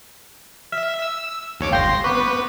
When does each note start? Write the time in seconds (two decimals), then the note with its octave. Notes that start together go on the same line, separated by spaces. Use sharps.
0.72 E5 F6
1.02 E6
1.60 D#2 C#5 D6
1.72 G1 F5 G5 C6 G6 A#6
2.04 B3 B4 C#6 D6